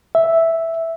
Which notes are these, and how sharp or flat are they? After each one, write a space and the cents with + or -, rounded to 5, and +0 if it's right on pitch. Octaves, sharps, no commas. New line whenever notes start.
E5 -5